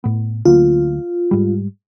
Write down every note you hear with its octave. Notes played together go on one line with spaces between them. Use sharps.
A2 B3
D2 F#3 A#3 F4
G#2 G3